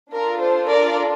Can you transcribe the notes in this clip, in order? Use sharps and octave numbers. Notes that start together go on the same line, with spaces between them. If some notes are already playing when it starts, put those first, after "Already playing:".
D4 F4 A4 A#4
C5
A#4 D5